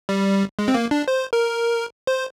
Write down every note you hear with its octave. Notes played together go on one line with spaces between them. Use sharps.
G3
G#3
C4
A#3
D4
C5
A#4
C5